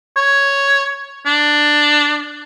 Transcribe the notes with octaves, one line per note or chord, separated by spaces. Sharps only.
C#5
D4